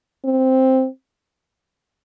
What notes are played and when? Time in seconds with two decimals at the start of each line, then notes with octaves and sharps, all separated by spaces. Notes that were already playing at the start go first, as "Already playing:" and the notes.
0.25 C4